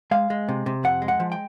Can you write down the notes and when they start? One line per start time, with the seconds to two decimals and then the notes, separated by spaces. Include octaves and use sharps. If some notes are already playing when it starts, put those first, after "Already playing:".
0.11 G#3 F5
0.30 G#3
0.49 C3
0.66 C3
0.84 F2 F#5
1.02 G#3
1.08 F#5
1.20 F3
1.32 G5